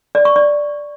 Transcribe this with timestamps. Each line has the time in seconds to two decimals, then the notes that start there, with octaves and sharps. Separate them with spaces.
0.15 D5
0.25 C#6
0.36 D5